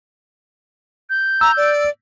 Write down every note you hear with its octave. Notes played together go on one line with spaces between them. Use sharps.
G6
A#5 E6
D5